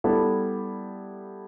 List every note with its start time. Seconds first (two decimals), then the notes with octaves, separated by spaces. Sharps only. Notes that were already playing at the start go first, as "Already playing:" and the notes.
0.04 G3 B3 E4 A4